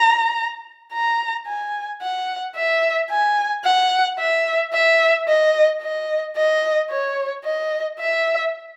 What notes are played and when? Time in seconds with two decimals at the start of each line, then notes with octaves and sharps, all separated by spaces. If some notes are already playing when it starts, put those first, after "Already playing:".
Already playing: A#5
0.93 A#5
1.47 G#5
2.02 F#5
2.56 E5
3.10 G#5
3.64 F#5
4.19 E5
4.73 E5
5.28 D#5
5.82 D#5
6.37 D#5
6.91 C#5
7.45 D#5
8.00 E5